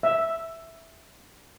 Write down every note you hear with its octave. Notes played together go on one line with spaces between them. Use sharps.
E5